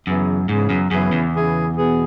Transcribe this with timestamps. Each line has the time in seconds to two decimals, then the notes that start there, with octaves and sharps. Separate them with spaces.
0.07 F#2 C#3 E3 B3 G#4
0.48 G#2 C#3 E3 B3 G#4
0.70 F#2
0.91 F#2 C#3 E3 B3 G#4
1.12 E2
1.33 C#3 E3 B3 G#4
1.75 B2 B3 G#4